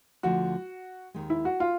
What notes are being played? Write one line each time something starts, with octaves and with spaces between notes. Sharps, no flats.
D2 D3 F3 A3 F#4
D#2 D#3 G#3
E4
F#4
F4